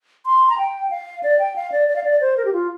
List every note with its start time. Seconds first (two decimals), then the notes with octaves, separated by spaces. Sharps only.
0.26 C6
0.49 A#5
0.58 G5
0.90 F5
1.23 D5
1.39 G5
1.56 F5
1.72 D5
1.88 D5
1.96 F5
2.04 D5
2.21 C5
2.37 A#4
2.45 G4
2.53 F4